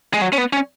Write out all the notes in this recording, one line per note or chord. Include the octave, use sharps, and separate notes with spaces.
G#3
F#3
C#4
B3
C#4